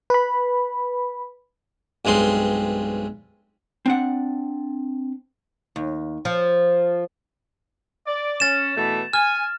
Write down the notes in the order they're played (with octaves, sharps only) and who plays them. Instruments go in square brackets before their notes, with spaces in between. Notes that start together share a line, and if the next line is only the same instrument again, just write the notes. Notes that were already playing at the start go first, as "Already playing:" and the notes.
[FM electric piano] B4 B5
[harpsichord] B1 G2 G#3 C4 C6
[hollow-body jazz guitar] C4 D4 F#5
[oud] D#2
F3
[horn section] D5
[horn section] C#4 [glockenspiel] A6 E7
[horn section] B2 E3 A3
[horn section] G#5 [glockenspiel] F6